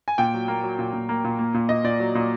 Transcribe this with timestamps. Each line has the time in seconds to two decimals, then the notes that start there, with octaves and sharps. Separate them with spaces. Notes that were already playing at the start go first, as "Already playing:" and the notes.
0.08 G#5
0.18 A#2 G5
0.34 F#3
0.48 A#3
0.63 F#3
0.79 A#2
0.93 A#2
1.09 A#3
1.24 A#2
1.39 A#3
1.54 A#2
1.69 A#2 D#5
1.84 A#2 D5
2.00 F#3
2.15 A#2